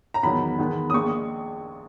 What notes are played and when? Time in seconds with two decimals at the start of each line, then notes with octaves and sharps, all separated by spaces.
0.14 A#5
0.23 E2 D#3 F#3 B3 B5
0.58 E2 D#3 G#3 B3
0.90 D#6
0.94 A#1 A#2 G#3 C#6